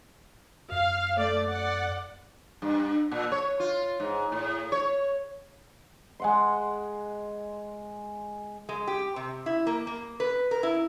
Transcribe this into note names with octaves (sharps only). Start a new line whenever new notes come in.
F#2 F5
A3 D5
D5 F#5
G2
A#2
C#5
F4
G#2
A2
C#5
G#3 F#5 C6
G#3
G4
C3
E4
A#3
A#3
B4
A#4
E4